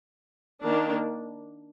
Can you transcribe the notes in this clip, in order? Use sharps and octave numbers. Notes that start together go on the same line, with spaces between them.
D#3 A#3 D4